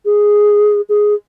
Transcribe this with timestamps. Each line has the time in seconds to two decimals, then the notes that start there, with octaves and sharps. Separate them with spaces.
0.05 G#4
0.89 G#4